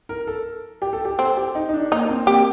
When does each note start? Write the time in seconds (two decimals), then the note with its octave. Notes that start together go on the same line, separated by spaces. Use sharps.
0.09 A#4
0.27 A4
0.82 G4
0.93 A4
1.05 G4
1.18 C4 A4
1.37 G4
1.55 D#4
1.69 D#4
1.74 D4
1.92 A#3 D#4
2.09 C4
2.27 A#3 G4